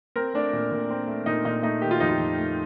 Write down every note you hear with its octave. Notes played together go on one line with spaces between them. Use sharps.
C4 A#4
A3 D4
A#2
A#2
C4
A3
A#2 D#4
A#2 D#4
A3 D#4
D#3 G4
F4
F2 D#4
F4
F2
A3